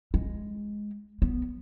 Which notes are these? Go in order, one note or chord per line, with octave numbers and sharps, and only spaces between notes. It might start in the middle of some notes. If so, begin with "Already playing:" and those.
G#3
B3